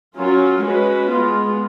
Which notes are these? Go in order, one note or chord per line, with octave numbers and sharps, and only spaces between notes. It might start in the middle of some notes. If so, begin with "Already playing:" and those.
F#3 C#4 F4 A#4
G#3 C#4 F#4 B4
G#3 B3 F4